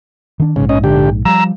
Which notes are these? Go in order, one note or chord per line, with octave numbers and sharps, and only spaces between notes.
D#3 D4
A#1 G#2 C#3
C#4 D#5
D3 G4
F3 G3 A#5 E6